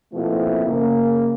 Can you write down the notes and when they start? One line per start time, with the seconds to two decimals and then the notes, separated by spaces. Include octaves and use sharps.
0.13 B2 F3 A3 A#3 C4 E4
0.65 C#3 A#3